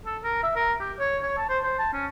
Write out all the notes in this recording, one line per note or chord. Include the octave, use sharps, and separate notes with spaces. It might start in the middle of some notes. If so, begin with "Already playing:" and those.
A4
A#4
E5
A#4
G4
C#5
C#5
A5
C5
C5
A5
C#4